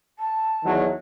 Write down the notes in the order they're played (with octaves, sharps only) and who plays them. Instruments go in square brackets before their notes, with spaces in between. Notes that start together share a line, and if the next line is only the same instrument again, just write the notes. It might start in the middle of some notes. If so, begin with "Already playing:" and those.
[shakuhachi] A5
[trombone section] E2 D#3 F#3